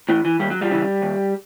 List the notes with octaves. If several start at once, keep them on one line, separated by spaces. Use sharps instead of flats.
A2 E3
E3
D#2 G3
F#3
F3 G3
C#3 E3
D#2